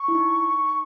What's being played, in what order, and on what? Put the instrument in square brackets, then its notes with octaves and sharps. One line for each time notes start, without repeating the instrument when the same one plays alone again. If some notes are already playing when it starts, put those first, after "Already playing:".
Already playing: [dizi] C#6
[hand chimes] E4
D#4